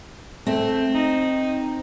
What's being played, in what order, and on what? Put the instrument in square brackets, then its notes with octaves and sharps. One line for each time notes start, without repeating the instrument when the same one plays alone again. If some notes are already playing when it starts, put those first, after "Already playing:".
[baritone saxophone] A3 [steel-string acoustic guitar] C4
[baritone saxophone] D#4